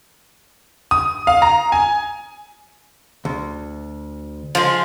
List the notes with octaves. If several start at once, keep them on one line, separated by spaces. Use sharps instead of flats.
D#6
F5
A#5
G#5
D2
F3 G#3